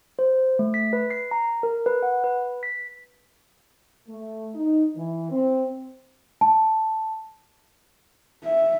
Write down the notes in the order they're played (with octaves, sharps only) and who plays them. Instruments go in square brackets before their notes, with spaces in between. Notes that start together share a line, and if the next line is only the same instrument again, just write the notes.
[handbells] C5
A3
B6
B4
C7
A#5
A#4
B4
F#5
B4
B6
[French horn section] A3
D#4
E3
C4
[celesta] A5
[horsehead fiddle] E5